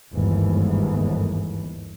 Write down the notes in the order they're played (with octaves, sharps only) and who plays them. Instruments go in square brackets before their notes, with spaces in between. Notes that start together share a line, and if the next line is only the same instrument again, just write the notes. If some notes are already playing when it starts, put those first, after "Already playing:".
[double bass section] G1 D#2 G#2 E3